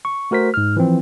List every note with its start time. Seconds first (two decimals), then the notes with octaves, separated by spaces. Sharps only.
0.05 C#6
0.31 A3 F#4 A#4 C5 B6
0.54 G#2 F6
0.77 E3 F3 C4